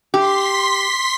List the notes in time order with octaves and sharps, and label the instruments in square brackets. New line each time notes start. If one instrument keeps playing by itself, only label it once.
[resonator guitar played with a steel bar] G4 [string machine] C6 B6